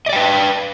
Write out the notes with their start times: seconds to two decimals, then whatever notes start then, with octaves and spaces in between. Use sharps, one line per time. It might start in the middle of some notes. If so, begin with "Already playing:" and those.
0.06 D#5
0.09 D5
0.13 G5
0.16 B4